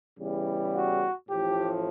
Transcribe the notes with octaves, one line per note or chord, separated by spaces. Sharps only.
E2 C#3 E3 G3
F#4
A1 A2 F3 G4